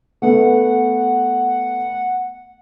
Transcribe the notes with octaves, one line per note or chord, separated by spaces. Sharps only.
A3 B3 F#5